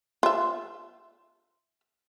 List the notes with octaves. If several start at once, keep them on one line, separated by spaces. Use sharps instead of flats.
F4 E5